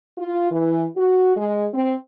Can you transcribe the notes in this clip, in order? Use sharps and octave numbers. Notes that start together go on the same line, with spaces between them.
F4
E3
F#4
G#3
C4